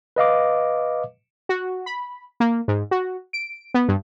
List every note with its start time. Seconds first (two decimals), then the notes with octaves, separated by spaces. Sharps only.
0.16 B4 D#5 F5 D6
1.49 F#4
1.86 B5
2.40 A#3
2.68 G#2
2.91 F#4
3.33 D7
3.74 B3
3.88 G2